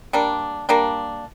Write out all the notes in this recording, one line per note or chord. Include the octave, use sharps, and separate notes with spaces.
G3 A#3 D4
G3 A#3 D4